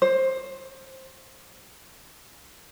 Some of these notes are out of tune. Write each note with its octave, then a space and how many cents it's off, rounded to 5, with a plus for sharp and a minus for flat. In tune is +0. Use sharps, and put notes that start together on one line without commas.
C5 +15